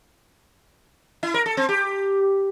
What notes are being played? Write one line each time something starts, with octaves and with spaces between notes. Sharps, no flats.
E4
A#4
A4
C4
G4